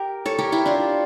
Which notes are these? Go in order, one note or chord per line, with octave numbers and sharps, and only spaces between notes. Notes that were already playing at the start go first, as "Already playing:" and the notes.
Already playing: G4 A#4
A4 C#5
G4 A#4
E4 G4
D4 F4